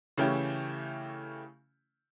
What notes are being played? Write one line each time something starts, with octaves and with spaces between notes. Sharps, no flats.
C#3 E3 A3 C#4 E4 G4